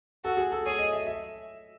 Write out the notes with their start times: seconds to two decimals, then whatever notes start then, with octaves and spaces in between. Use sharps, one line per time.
0.24 F#4 A4
0.37 G#4
0.52 A4
0.66 G#4 C#5
0.79 D#5
0.93 E5
1.07 E5